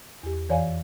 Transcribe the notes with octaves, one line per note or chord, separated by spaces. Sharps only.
E2 G4
F2 E3 C#5 D5 F5 G#5